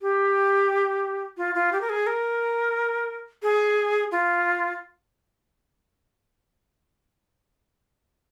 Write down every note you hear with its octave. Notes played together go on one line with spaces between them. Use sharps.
G4
F4
F4
G4
A#4
G#4
A#4
G#4
F4